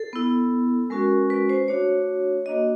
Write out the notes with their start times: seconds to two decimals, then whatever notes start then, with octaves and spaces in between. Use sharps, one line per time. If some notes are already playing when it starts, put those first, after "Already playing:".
Already playing: A4
0.13 B3 E4
0.90 G#3 C#4 F#4 A#4
1.30 B4
1.50 C5
1.68 A3 D4 F#4 C#5
2.46 A#3 D4 F#4 D#5